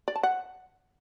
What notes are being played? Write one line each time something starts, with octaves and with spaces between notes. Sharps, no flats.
D5
A5
F#5